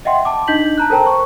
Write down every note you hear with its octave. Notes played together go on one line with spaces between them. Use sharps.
D#5 E5 F#5 G5 C6
A5 D6
D4 D#4 D#5 G6 B6 F#7
A5 A#5 F#6
A4 A#4 C5 G5 A5 A#5
C5 C#6